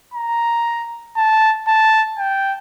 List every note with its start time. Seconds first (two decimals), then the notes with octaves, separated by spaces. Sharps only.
0.14 A#5
1.16 A5
1.68 A5
2.18 G5